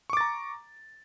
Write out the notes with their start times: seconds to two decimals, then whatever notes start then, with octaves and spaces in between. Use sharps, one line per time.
0.10 C#6
0.13 D6
0.17 A6
0.21 A#5